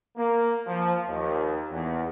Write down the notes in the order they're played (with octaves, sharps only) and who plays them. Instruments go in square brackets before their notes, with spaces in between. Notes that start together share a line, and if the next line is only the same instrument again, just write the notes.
[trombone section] A#3
F3
D#2
E2